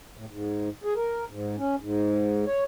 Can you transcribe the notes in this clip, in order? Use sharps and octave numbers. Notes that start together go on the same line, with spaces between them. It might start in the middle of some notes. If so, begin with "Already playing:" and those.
A2
G#2
G#4
A#4
G#2
C#4
G#2
C#5